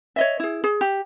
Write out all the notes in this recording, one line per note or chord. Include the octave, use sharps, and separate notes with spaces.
C#5 D#5 E5
E4 G#4
G#4
G4